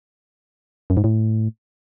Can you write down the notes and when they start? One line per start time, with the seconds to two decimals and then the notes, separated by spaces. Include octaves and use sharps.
0.90 F#2
0.97 G#2
1.04 A2